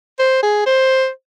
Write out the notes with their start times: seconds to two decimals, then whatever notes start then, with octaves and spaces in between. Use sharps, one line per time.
0.19 C5
0.42 G#4
0.66 C5